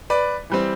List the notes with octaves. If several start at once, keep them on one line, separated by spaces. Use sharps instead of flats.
B4 D5
E3 G3 C4